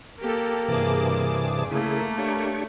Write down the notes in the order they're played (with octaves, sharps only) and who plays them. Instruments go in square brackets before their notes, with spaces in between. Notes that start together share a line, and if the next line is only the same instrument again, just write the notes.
[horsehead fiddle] A#3 [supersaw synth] G4 A4
[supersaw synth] G2 G#4 D6 [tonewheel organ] C3 E3 A5
[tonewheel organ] C#3 E4 G#4 [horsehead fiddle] A3 [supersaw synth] A#3
[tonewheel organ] D4 G4 C#5